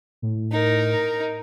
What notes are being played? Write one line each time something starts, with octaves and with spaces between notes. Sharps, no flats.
A2
D#4 A#4